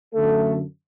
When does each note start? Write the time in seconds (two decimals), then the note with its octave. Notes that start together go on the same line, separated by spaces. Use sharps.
0.14 F#2 D3 A3 A4